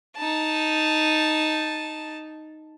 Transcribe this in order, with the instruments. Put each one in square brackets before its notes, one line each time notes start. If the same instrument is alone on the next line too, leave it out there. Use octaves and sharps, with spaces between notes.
[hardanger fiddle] D#4 A5